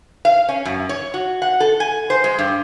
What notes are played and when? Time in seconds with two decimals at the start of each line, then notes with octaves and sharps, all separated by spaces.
0.25 F5
0.48 C#4
0.65 F#2
0.89 C#5
1.14 F#4
1.42 F#5
1.60 A4
1.80 G#5
2.10 C5
2.24 G#3
2.39 G2